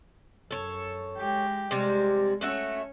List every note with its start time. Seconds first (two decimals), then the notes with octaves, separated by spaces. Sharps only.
0.51 F#2 A4 C#5
1.17 G#3 G4
1.71 C3 G3 G#3
2.41 A3 C#4 F#4 E5